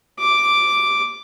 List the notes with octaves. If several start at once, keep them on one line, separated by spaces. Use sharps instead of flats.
D6